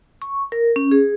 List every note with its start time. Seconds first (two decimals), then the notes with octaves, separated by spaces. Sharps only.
0.22 C#6
0.52 A#4
0.76 C#4
0.91 G#4